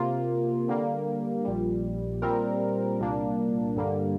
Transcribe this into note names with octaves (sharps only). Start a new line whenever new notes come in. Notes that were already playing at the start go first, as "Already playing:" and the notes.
Already playing: C3 A#3 F4
D3 G3 A#3
A#1 A#2 G3
A#2 G3 C4 A#4
C2 A#2 A#3 D4
G2 D3 G3 A#3